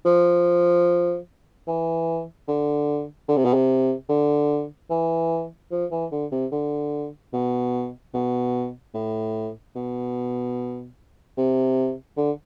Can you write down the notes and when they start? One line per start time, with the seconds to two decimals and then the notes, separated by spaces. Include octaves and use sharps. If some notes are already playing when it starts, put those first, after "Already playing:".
0.05 F3
1.67 E3
2.48 D3
3.29 D3
3.37 C3
3.45 B2
3.54 C3
4.09 D3
4.90 E3
5.71 F3
5.92 E3
6.12 D3
6.32 C3
6.52 D3
7.33 B2
8.14 B2
8.94 A2
9.76 B2
11.37 C3
12.17 D3